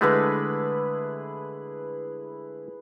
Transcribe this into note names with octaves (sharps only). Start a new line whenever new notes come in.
D3 G#3 A3 E4 G#4 B4